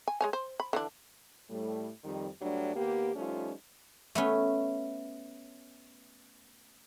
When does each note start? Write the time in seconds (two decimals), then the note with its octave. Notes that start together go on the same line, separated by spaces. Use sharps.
0.08 G#5
0.21 G#3 C#5 G#5
0.33 C5
0.60 B5
0.73 D3 E3 D4
1.49 A2 G3 A3
2.04 F2 D#3 G3
2.40 G2 F#3 G3 A3 D4
2.74 D#2 A#3 B3 G4
3.15 F3 G3 A3 C#4 D#4 F4
4.15 A3 B3 C#4